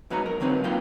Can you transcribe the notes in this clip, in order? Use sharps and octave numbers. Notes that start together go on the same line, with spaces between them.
G#2 F#3 B3 D#4 A#5
A#4
D3 F#3 C4 D#4 B4
A#3 B3 F4 B4 G5